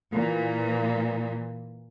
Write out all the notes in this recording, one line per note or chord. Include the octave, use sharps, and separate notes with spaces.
A#2 E3